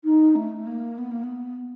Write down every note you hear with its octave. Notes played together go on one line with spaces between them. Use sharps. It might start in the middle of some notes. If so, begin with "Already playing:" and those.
D#4
A3
A#3
B3
A#3
B3